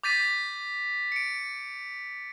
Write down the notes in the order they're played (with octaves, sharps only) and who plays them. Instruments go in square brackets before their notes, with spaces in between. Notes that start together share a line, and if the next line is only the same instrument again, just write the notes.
[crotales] D6 G6 A6 B6 D#7
C#7 D7